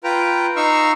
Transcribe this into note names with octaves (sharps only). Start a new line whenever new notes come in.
F4 B4 G5 A#5
D#4 F5 A#5 C#6 E6 F6